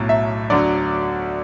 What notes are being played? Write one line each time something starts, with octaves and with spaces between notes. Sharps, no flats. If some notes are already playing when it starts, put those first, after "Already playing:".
Already playing: B1 A2 F#3
E5
D2 D3 F#3 D5